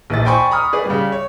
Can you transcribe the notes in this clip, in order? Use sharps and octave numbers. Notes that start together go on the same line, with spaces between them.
A#1 E3 D#5 A6
C5 D5 G5 G#5 B5 C#6
A#5 B5 C#6 D#6 F6
G#4 B4 D5
C#3 G3
C#5